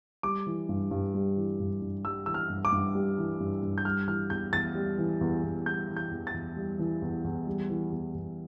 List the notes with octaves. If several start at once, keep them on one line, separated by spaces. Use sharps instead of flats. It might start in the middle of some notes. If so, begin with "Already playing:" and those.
G3 D6
E3
G2
G2
G3
E3
G2
G2
G3 E6
E3 E6
F6
G2
D6
G2
G3
E3
G2
G2
G6
G3 F6
E3 F6
E2 G6
E2 A6
G3
E3
E2
E2
G3 G6
E3
G6
E2
A6
E2
G3
E3
E2
E2
G3
E3
E2
E2